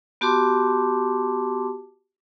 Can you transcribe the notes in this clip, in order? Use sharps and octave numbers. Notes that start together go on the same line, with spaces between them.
B3 F#4 G4 A5 C6 D6